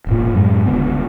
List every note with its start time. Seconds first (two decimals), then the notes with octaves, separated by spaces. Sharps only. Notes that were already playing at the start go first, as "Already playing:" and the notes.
0.07 E1 A1 A#2
0.34 F#2 A2 F#3 G#3
0.65 D#1 C#2 D3 B3